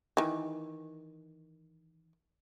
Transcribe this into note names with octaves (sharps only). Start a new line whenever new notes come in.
D#3 E3